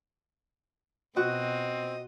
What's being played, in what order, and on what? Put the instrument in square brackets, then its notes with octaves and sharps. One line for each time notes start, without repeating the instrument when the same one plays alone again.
[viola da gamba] B2 [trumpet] C4 [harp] F#4 [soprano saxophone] D#5